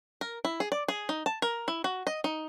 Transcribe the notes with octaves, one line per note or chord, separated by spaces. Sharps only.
A#4
E4
G#4
D5
G#4
D#4
A5
A#4
E4
F#4
D#5
D#4